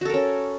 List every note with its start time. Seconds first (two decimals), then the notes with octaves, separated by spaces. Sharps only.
0.01 F#4
0.05 A4
0.09 A#4
0.14 C#4